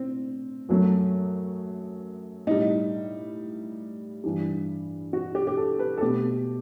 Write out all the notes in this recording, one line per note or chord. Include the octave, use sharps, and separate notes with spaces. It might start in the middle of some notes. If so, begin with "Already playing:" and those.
Already playing: A2 C4
F#2 F#3 A3
A2 G3 D#4
G2 E3 G3
F#4
G4
G4
A4
B4
A4
B2 A3 G4